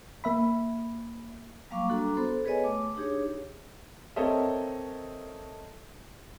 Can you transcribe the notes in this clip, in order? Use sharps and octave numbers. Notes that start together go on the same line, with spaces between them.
A#3 E5 B5
F#3 G3 A#3 F5 C#6 D6
G3 D4 F#4 A4 A#5 C6
B3 A4 C5
G#4 B4 C#5 D#5 G#5
A3 D6
D4 D#4 G4 G#4 C#5
C4 A4 A#4 C#5 D#5 E5